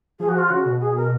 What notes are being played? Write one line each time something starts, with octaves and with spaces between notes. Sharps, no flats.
F3 G#4
F#4
F4
C#3 F#4
B2
G#4
A#4